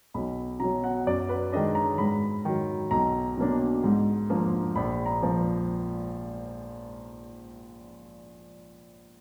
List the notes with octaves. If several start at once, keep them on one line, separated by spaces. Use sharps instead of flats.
B1 B5
B2 F#3 A#5
F#5
F#2 D5
B4
D#3 G#3 D4 D#5
A#5
G#2 B5
D#3 F#3
B1 A#5
B2 F#3 A#3 D4
G#2
F3 A#3 D4
A#1 B5
A#5
A#2 F3 A#3